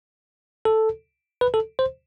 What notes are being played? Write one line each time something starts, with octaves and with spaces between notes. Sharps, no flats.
A4
B4
A4
C5